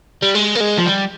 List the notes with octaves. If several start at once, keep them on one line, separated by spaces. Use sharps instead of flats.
G3
G#3
A#3
G#3
F3
G3